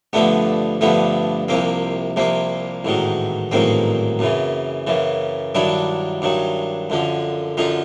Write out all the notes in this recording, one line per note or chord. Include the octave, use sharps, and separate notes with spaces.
G2 D3 F3 A3 B3
G2 D3 F3 A3 B3
C2 C3 F3 A#3 C4
C2 C3 F3 A#3 C4
A1 G#2 D#3 F#3
A1 G#2 D#3 F#3 A#3 C4
F#2 C#3 E3
F#2 C#3 E3
G2 D#3 F#3 D4 E4
G2 D#3 F#3
F#2 D3 F3
F#2 D3 F3 D#4 F4